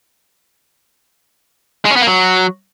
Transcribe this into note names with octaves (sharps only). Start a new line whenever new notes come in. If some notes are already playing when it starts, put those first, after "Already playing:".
G#3
C#4
B3
A#3
F#3